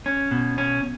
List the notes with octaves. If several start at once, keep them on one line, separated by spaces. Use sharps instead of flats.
C#4
B2
C#4